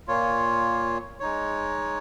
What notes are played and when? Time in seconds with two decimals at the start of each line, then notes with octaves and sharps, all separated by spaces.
0.08 A#2 A#3 F4 C#5
1.20 G#3 D#4 C#5